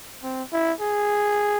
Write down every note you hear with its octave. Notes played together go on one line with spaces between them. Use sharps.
C4
E4
G#4